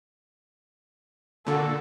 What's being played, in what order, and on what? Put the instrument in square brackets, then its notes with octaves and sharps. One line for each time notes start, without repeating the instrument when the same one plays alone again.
[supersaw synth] A#2 D3 [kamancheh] F#4 A4